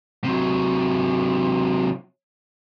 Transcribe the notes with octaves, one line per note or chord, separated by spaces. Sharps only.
C3 F#3